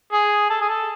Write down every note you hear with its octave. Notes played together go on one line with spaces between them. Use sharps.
G#4
A4
G#4
A4